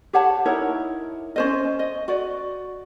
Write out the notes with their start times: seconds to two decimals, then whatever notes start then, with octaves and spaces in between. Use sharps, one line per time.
0.13 G4 C#5 F#5 A5
0.45 D#4 E4 A#4 C#5
1.36 C#4 C5 D#5
1.79 D#5
2.08 F#4 D5